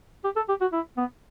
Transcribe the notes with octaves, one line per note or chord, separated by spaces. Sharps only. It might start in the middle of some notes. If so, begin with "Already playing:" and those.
G4
A4
G4
F#4
E4
B3